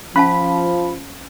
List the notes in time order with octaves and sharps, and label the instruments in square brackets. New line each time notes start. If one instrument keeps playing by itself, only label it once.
[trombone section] F3 [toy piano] C#4 F5 A5 [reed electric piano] B5